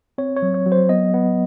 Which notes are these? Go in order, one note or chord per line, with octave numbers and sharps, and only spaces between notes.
C4 C#5
C#5
F#3
C#5
F#3
C5
B3 D#5
B3